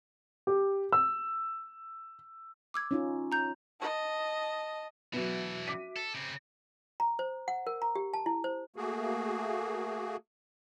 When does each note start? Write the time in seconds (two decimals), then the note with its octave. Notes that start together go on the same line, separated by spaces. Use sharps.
0.47 G4
0.93 E6
2.74 D6 E6 G#6
2.91 C#4 D#4 F4
3.32 A#5 G6
3.80 D#5 A5
5.13 B2 E3 F#3 B3 F#4 E5
5.67 D6 B6 D#7
5.96 A4
6.14 C#3 C4
7.00 A#5
7.19 C5
7.48 F#5
7.67 A#4
7.82 A#5
7.96 G4
8.14 A5
8.26 E4
8.44 C5
8.76 A3 A#3 F#4 G#4